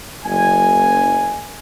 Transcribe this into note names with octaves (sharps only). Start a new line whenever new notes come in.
F#1 G#5